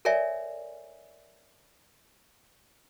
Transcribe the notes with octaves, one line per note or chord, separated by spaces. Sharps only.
A4 A#4 C#5 D5 E5 G#5